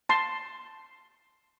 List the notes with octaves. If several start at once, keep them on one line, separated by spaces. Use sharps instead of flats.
A5 C6